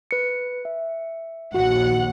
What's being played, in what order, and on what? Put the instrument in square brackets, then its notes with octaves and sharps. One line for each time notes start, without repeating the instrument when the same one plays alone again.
[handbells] B4 C#7
E5
[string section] A#1 D#2 F#5 [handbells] F#4